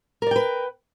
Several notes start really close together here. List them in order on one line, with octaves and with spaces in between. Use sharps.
A#4 D5 G5 B4